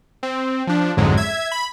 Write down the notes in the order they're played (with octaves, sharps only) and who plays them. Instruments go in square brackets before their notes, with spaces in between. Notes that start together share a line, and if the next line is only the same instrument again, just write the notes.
[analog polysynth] C4
F3 D4
A1 F2 G#2 D3 F#3 G#3
E5 G#6
B5